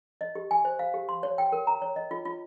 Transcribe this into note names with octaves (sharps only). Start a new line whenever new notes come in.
D#5
G4
G#5
C5
F5
G4
C6
C#5
G5
A#4
A#5
C#5
D#5
F4
F4